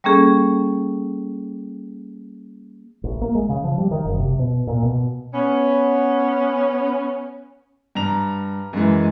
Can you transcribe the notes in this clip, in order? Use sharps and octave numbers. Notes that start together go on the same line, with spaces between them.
G3 A#3 C#4 G#4 A4
A1
A#3
G#3
C#3
F3
G3
D#3
F#1
C3
B2
A#2
B2
B3 C#4
G2 A#5 F7
F#2 E3 G#3